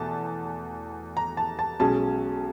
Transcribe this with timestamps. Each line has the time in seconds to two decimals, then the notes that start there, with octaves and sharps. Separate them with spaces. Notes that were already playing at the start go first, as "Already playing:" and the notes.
Already playing: E2 B2 A3 A5
1.17 A#5
1.37 A5
1.59 A5
1.80 B1 B2 G#3 C#4 A5